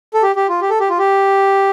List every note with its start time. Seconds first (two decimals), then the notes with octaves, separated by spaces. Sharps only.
0.14 A4
0.23 G4
0.36 G4
0.49 F4
0.61 G4
0.70 A4
0.80 G4
0.89 F4
0.98 G4